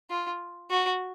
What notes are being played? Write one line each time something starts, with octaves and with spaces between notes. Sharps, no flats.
F4
F#4